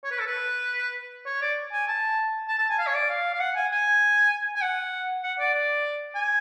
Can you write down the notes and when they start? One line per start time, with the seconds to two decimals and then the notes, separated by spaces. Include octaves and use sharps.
0.04 C#5
0.11 B4
0.19 A4
0.26 B4
1.26 C#5
1.42 D5
1.72 G#5
1.88 A5
2.48 A5
2.59 A5
2.69 G#5
2.79 F5
2.87 C#5
2.94 D5
3.09 F5
3.34 F5
3.40 F#5
3.56 G#5
3.71 G#5
4.56 G#5
4.62 F#5
5.23 F#5
5.39 D5
5.54 D5
6.15 G#5